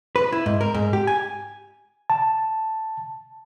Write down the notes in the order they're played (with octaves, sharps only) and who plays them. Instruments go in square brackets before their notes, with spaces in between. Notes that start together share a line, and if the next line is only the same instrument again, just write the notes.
[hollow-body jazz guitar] B4
E4
G#2
A#4
G#2
G4
G#5
[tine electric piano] A5